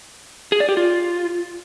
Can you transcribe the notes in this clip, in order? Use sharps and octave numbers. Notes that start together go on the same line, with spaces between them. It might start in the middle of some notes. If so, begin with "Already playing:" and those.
G#4
D5
G4
F4